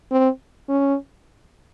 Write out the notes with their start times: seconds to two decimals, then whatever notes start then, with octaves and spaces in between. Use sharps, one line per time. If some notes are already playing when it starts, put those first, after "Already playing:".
0.12 C4
0.69 C#4